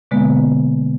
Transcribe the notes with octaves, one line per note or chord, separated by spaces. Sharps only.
B2 D3 G#3 A#3 B3